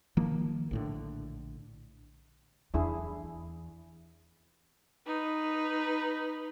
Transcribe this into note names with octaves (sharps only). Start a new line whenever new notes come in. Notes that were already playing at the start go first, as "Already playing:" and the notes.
D#3 F3 A#3
A#1 A2 D3
E2 D4 E4 G#4
D#4 B4